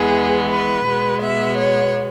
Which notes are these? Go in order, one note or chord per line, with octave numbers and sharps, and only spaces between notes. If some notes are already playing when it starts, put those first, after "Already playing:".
Already playing: E2 E3 G#3 B3 G#4
B4
B2 G#3 B3
E5
C#5